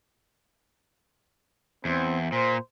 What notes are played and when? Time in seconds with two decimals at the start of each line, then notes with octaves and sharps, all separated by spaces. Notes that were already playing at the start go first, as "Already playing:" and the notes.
1.85 E2 C4
2.32 A#2 C5